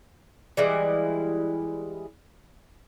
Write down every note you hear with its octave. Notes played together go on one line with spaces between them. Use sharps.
E3 G3 G#3 E4